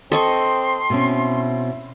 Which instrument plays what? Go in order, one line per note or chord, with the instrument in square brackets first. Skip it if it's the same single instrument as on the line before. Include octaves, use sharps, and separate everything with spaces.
[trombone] C4 [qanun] A4 D#5 C#6 [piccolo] C6
[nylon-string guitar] B2 C4 C#4 [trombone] E4